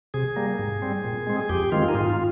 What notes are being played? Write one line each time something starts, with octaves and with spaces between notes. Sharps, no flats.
C3 G#4
G3 A#3
G#2
G3 C4
A#2
G#3 C4
G#4
F2 G4
D#3 G#3 C4 F4
D#4
G#2 F4
F4